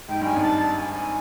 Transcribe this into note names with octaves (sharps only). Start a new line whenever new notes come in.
G#2 G5
G2 G#5
G#1 G#2
A5
A5
G#5
G#5